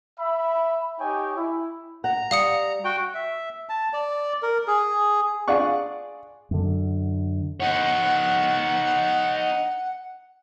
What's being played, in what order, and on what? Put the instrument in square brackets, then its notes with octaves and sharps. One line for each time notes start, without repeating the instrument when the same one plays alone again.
[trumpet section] E5 B5
D#4 G4 C#5 G5 G#5
E4
[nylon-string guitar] F#5 [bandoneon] A#5
[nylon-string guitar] G3 [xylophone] F5 D#6 C#7
[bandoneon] F#4 G5
[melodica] E5
A5
D5
A#4
G#4
[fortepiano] D4 F4 G#4 D5 F#5 C#6
[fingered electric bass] F#2 D3
[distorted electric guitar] D#4 C#5 [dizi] F#5